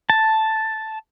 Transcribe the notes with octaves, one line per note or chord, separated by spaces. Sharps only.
A5